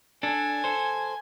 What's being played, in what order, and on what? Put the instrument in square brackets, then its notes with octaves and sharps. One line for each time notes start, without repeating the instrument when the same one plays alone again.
[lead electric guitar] D4 A4 [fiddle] G#5
[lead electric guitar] A4 C5